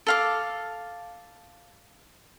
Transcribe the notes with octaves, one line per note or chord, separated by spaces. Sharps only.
A4 F5 D6